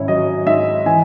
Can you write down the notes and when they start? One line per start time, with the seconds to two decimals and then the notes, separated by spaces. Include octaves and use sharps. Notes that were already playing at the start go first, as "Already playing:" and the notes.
Already playing: G#1 C#4 E4 C#5
0.08 F#3 D#5
0.46 G#2 E5
0.86 E3 G#5